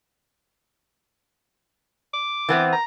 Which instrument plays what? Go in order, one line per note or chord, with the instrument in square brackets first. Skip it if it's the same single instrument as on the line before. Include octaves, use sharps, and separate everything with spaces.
[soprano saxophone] D6
[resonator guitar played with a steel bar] E3 B3 C4
[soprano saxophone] A#5